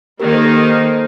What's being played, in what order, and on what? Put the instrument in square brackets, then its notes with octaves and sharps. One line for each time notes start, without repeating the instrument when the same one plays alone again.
[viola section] D#3 A#3 D#4 [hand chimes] G4 A#4
[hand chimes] A4 C5
A4 C5
A4 C5